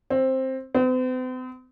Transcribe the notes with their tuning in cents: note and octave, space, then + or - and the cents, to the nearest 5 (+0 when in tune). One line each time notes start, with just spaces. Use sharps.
C4 +10
C4 -45